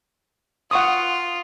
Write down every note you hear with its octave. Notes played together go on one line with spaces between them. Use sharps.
F4 F#5 C#6 D#6